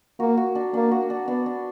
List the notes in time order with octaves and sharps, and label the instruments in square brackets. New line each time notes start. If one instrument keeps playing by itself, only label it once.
[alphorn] A#3 [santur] F#4
[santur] F#4
D4
[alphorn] A#3 [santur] D4
[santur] F#4
D4
[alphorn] B3 [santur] D4
[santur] D4